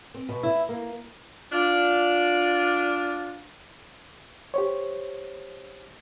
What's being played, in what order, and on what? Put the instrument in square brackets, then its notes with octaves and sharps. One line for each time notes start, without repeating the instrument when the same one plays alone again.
[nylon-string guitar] C4
B2
E4
A#3
[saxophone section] D4 F4
[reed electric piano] G4 C5 C#5